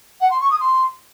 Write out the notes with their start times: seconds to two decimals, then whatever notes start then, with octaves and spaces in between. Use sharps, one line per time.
0.20 F#5
0.30 C6
0.40 C#6
0.50 D#6
0.60 C6